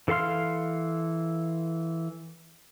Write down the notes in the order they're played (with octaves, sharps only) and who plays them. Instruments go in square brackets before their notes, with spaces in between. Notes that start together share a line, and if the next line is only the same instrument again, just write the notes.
[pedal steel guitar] E3 A4 F5 C6 F6